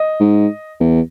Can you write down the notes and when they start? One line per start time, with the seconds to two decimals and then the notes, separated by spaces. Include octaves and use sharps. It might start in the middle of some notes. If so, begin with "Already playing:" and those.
Already playing: D#5
0.20 G#2
0.80 E2